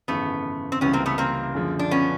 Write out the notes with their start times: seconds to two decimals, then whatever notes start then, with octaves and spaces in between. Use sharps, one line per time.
0.08 G#1 F#2 C#3 E3 A3 B3
0.72 C4
0.81 C#2 C3 E3 G3 B3 C#4
0.93 A#3 C4
1.06 A3 B3
1.18 A#3 C4
1.54 F#2 D3 F3 G#3
1.79 D4
1.91 B3 C#4